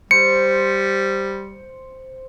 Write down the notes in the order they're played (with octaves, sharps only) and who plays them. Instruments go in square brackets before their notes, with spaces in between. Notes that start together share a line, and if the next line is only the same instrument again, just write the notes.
[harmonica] G3 [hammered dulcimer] C5 [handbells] C#7